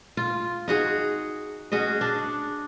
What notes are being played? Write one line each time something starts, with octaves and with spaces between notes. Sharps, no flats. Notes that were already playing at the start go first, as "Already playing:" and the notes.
F4
D#4 F#4 G#4
C#4 F#4 G#4 D#5
D4